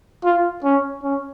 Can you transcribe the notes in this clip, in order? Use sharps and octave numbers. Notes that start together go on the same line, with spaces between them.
F4
C#4
C#4